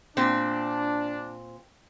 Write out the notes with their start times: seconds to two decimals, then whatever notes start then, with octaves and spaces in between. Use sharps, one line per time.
0.17 A#2 C4 D4